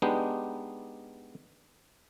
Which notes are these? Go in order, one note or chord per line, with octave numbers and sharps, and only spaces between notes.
G#3 B3 D4 D#4 G4